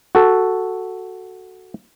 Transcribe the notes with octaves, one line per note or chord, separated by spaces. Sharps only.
F#4 A4